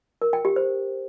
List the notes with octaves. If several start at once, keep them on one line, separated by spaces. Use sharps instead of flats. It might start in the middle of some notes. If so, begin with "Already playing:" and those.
A#4
G5
G4
C5